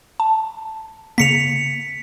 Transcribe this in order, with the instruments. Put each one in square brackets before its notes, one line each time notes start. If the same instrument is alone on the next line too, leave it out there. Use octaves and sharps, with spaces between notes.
[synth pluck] A5
[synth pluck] C#3 A#3 [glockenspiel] B6 C#7 F7